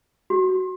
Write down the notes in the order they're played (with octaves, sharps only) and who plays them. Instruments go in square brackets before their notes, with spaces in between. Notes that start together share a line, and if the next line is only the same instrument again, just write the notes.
[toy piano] F#4